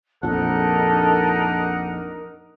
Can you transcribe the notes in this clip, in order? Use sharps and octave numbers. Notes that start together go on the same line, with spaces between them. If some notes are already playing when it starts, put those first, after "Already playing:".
A#1 F2 D4 D#4 A4 A#4 F#5